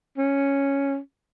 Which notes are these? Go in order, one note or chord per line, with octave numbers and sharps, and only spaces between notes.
C#4